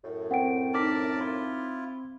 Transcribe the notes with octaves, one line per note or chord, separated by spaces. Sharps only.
F#2 A2
C4 F#5 G5 D7
D#4 A#4 D5 A5 D6 B6
E4 F4